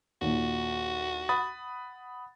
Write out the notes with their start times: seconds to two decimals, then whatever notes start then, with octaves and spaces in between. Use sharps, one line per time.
0.21 D#2 A#2 F#4
1.29 F#5 B5 D#6 A6